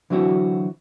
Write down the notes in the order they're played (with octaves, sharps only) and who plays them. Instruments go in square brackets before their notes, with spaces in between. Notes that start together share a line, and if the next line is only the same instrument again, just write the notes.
[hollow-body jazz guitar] D3 E3 F#3 C4 E4 F#4